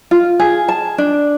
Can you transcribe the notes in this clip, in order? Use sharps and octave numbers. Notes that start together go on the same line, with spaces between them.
F4
G#4
A5
D4